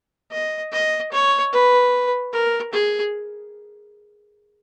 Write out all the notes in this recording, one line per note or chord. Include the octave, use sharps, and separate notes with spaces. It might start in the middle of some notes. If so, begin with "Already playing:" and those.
D#5
D#5
C#5
B4
A#4
G#4